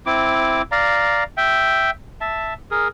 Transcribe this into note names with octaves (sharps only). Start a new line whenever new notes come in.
C4 E4 D6
D5 F5 A#5
E5 G5
E5 A5
G#4 A#4